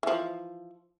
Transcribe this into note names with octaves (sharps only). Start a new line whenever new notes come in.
E3 F3